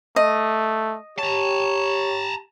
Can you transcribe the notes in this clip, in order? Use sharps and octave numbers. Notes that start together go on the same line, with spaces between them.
A3 D#5
G4 C#5 A5 A#5